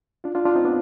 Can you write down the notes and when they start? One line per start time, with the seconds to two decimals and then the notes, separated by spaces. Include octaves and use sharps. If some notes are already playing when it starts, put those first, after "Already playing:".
0.24 D4 F4
0.35 D4 F4
0.45 D4 F4
0.55 C4 D#4
0.64 B3 D4